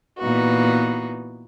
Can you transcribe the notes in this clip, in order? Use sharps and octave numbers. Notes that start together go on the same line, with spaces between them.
A#2 E3 B3 D#4 F#4